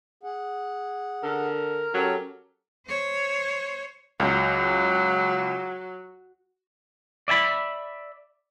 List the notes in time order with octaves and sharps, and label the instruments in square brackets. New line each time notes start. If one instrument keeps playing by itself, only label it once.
[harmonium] G#4 F#5
[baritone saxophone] D3 [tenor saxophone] A#4
[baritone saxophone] F#3 [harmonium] C#4 G4 A4
[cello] C5 C#5
[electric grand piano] C#2 [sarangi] F#3
[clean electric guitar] D5 E5 G#5 B5